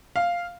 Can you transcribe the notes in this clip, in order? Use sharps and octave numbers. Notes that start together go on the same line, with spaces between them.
F5